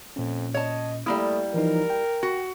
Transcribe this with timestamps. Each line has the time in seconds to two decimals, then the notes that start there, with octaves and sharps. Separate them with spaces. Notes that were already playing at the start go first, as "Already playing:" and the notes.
0.16 F2 A#2 C#4
0.54 C#5 D#5 A5
1.06 G3 A3 A#3 E4 D#6
1.54 E3 F3 D#4 A#4
1.90 G5
2.23 F#4